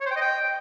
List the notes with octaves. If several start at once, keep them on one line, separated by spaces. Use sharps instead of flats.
C#5
C5
G5
D#5
G5